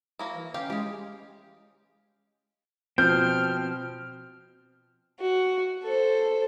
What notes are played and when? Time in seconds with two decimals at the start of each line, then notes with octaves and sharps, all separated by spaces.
0.19 F#3 A#3 E4
0.35 E3
0.54 C#4 G4 F5
0.70 E3 G#3 G4 G#4
2.98 B2 F3 C4 F6 G6
5.20 F#4
5.83 A4 C5